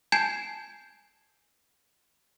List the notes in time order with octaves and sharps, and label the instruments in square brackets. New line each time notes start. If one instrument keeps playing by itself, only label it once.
[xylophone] G#5 A5 G6 G#6 C7 E7